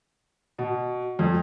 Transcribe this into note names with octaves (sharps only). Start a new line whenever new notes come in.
B2
F2